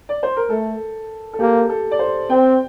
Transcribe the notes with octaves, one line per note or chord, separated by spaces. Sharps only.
D5
C5
A#4
A3 A4
A4
A#3 G4
A4
D5
C5
C4 G5